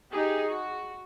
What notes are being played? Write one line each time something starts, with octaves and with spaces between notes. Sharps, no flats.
D#4 G4 G#4
F#4